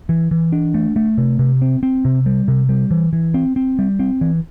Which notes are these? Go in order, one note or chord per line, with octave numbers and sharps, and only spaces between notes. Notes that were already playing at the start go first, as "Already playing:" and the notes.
E3
E3
D4
A3
A3
C3
C3
C4
C4
C3
G3
C3
G3
E3
E3
C4
C4
G3
C4
E3